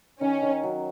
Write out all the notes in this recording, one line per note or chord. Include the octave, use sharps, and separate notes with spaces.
D#3 C#4
D#3
F#3